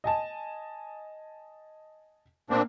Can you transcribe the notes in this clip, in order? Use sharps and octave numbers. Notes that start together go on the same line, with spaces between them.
D#5 G#5 A5
A#2 A#3 C4 D4